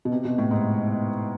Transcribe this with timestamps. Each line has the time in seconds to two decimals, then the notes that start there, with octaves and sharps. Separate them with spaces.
0.05 B2
0.12 C3
0.25 B2
0.38 A2
0.51 G#2